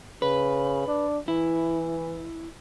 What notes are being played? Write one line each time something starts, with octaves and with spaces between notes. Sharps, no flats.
C#3 B4
D4
E3 E4